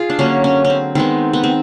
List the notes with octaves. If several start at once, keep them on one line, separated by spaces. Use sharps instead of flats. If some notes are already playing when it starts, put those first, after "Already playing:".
Already playing: F4 G#4
D4
D3 F#3 A#3 C#4
C#4
C#4
C4
D#3 G#3 B3 C4
B3
C4